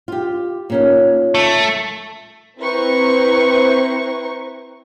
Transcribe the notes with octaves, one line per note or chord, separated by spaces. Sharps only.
F4 G4
A#2 C#4 D#4
A3
C4 E4 B4 C5 A#5 C#6